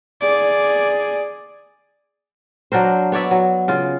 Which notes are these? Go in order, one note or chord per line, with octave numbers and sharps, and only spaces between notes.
G#4 D5
F#3 D4 A#4 C5
B3 C#5 D5 E5
F#3
C#3 F4